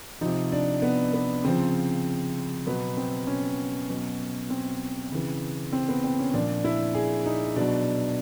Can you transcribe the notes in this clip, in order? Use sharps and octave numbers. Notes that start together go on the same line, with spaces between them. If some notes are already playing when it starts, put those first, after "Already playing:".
C3 F3 D#4
D4
B3
B3
C#3 F3 C4
B2 F#3 B3
C4
C#4
B2 F#3
C4
C#3 E3
C4
B3
C4
C#4
A#2 F3 D4
E4
G#4
D#4
B2 F#3 D4